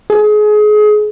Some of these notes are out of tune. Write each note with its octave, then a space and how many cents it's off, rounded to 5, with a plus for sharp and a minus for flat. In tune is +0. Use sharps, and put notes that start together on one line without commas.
G#4 +30